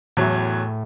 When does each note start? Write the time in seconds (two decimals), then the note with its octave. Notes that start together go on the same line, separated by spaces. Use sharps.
0.17 E2 A2 F#3